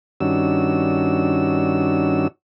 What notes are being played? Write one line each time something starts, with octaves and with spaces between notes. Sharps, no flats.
G2 D#3 C#4 D4 F#4 E6